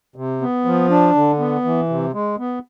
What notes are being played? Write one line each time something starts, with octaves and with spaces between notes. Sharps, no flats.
C3
B3
F3
D4
D3
B3
E3
C3
G#3
B3